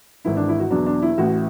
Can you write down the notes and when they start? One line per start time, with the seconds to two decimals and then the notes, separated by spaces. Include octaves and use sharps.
0.25 G#1 G#2 E3 E4
0.37 D4
0.49 E4
0.60 F#4
0.71 E2 B2 F#3 D4
0.87 D4
1.02 E4
1.17 A1 A2 E3 F#4